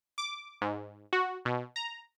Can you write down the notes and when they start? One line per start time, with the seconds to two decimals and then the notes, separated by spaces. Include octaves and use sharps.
0.18 D6
0.62 G#2
1.13 F#4
1.45 B2
1.76 A#5